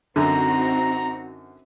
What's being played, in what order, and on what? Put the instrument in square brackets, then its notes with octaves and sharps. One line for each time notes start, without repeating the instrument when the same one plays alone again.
[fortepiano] F#2 D3 [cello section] C4 D#4 F#4 [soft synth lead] A#5